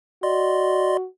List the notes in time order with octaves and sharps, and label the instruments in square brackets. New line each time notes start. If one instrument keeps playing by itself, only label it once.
[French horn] F#4 [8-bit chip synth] D5 D#5 C6